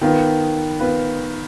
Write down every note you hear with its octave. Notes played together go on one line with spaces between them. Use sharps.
D#3 B3 F4 B4
B3 F4 B4